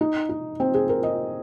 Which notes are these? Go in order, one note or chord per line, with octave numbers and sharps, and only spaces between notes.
D#4
D#4
C4
G#4
A#4
D#5